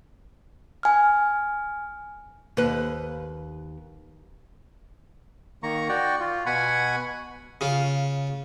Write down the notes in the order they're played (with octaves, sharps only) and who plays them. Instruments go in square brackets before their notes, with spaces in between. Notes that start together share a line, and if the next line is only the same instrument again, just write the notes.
[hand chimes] G#5 F6
[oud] D#2 B4
[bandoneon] D#3 A#3 A#5 C#6
F#4 D5 G5 C#6
F4
B2 F#5 G#5 B5 C#6
[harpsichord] C#3 F4